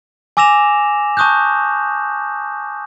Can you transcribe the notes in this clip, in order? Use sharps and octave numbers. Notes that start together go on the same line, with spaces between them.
G#5 D6 E6 A#6 E7 F7
A5 C#6 D#6 F#6 G6